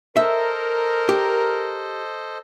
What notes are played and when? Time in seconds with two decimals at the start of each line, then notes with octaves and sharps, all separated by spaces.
0.17 A4 A#4 C5 D#5 E5
1.09 G4